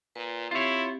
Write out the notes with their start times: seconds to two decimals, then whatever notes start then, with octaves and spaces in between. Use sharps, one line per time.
0.15 A#2 B4
0.51 C4 E4 F4 G4 C#5